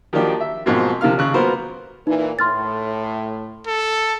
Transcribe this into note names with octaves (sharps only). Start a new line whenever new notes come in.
D#3 F3 F#3 A#3 D4 G4
E5
G#2 B2 F3 F#3 A#3 C4
C3 F3 A#3 F5 F6
G#1 C#3 F#6
F#3 A#3 B3 F4 A#4 C5
A#2 E3 D#4
A2 C6 F6 A6
A4